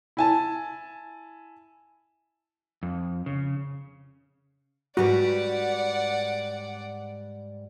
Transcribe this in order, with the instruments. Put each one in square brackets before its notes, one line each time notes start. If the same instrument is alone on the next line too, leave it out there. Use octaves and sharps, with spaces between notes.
[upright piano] E4 G#5 A5
[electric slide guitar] F2
C#3
[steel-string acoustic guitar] G#2 G3 B4 [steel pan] F#4 [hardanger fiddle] D5 F#5